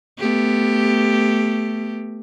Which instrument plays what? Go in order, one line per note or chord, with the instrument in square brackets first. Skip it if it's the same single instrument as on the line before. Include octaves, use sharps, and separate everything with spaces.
[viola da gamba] A3 B3 G4